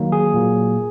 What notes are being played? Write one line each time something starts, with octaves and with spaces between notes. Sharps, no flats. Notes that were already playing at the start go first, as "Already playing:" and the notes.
Already playing: D#3 F#3 A#3
G#4
A#2 F#3 A#3